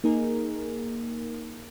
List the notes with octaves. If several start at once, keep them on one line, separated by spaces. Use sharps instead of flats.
A#3 D#4 G#4 A#4